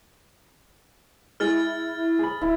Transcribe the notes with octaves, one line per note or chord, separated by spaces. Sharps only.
G#3 E4 G#4 F6 A6
G#4 B5
D1 E4